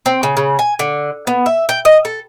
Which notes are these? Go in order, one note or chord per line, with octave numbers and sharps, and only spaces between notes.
C4
C#3
C#3
G#5
D3
B3
E5
G5
D#5
A4